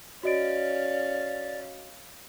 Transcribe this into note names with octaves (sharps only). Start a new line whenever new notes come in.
C#4 F#4 D5 D#5 F5 D7